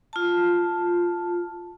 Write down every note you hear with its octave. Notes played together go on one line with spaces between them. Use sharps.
F4 A5